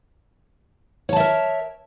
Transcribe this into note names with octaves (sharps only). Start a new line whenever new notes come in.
A#4 C#5 E5 A5